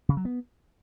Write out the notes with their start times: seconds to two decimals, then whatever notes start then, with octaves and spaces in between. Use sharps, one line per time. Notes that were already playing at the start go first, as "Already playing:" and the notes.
0.09 C#3
0.17 F#3
0.25 B3